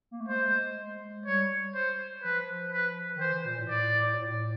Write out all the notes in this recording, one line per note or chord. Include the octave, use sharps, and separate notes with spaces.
A#3
A3
G#3 C5
G3 C#5
C5
F3 B4
B4
D#3
E3 C5
E3
A#2
A2
A2 D5
A2
A2
A2
A#2
A2